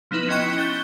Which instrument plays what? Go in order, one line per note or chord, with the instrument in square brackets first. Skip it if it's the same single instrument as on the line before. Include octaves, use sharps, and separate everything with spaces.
[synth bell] F3 B3 D#4 E4 B4
C#4 E4 D#5 G5 C#6 F#6
F#6 G6 A6 G7